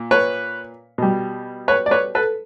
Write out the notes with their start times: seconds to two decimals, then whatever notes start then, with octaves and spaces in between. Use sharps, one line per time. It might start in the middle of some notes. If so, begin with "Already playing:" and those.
Already playing: A#2
0.11 B4 C#5
0.98 B2 G3
1.68 B4 C#5
1.86 D5
1.91 B4 C#5
2.15 A4 B4